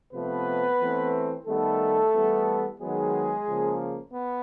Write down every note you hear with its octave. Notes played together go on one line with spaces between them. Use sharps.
C3 F3 A3 B3 B4
E3 A3 C4
D#3 G3 A3 B3 A4
E3 G3 B3
D#3 F#3 G#3 B3 G#4
C#3 F3 A#3
B3